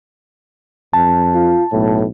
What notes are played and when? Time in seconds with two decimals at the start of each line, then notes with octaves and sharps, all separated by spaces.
0.93 F2 A5
1.34 F4
1.72 B1 A2